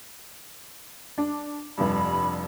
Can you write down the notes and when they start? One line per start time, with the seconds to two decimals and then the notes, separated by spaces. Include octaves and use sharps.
1.18 D4
1.78 F1 G2 B5